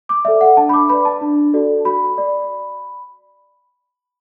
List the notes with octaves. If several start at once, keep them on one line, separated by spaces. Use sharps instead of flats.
D6
A4 D5 E5
F#5
D4 A5
B5
D6
B4 D5 B5
A5
D4
F#4 A4 D5
F#4 B5
D5